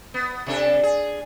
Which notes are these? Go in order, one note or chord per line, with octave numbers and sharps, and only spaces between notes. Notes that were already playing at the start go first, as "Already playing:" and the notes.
B3
C3 D4 A4
G#4